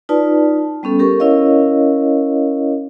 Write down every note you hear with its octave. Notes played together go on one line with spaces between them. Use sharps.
D#4 F4 B4 D5 A5
G3 B3 C#4 A4
G4 A4 A#4 C#6
C#4 E4 A#4 C#5 D#5 F5